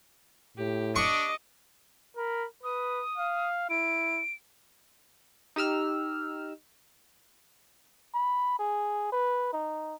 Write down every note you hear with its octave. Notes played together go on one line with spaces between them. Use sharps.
A2 G4
D4 D#5 C#6 D6
A#4 B5
B4 D#6
F5
E4 D7
D#4 G4 E6 F6
B5
G#4
B4
D#4